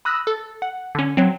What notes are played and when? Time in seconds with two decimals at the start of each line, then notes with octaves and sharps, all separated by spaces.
0.05 B5 D#6 E6 F#6 A#6
0.27 A4
0.62 F#5
0.95 D3 C#4
1.17 F#3 C4